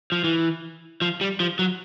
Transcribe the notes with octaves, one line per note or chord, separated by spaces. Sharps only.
F3
E3
F3
G3
F3
F#3